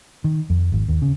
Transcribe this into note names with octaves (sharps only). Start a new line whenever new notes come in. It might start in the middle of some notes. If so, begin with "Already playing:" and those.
D#3
F2
G#1
D#2
C#3